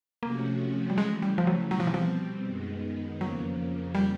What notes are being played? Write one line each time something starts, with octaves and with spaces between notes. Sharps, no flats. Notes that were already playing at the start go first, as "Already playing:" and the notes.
C3 F3 A3 A#3 C#4 F#4
G3
C#3 E3 G#3 A3
G3
F3
F#3
B2 F#3 G3 C4
F3
E3
F3
F#2 D#3 G#3 B3
F2 C#3 F3 F#3 A#3
G3